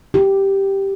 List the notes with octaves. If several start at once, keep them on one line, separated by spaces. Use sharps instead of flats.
G4